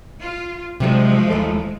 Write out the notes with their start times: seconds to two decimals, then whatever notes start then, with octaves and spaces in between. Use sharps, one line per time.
0.21 F4
0.80 C3 F3 F#3 G#3 A3 D4
1.30 D#2 E3 A4